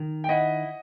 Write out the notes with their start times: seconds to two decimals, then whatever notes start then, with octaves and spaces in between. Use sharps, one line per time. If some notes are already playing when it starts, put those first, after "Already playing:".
Already playing: D#3
0.24 G5
0.29 E4 D#5 F#5